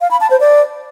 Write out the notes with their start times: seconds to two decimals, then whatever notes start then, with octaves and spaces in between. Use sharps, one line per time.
0.01 F5
0.11 B5
0.21 A5
0.31 C5
0.40 D5